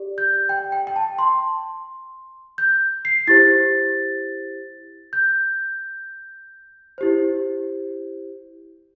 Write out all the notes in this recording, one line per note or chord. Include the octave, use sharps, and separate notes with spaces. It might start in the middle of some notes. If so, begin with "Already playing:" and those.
Already playing: G4 D5
G6
G5
G5
G5
A5
C6
G6
C7
E4 G4 C5 A6
G6
E4 G4 C5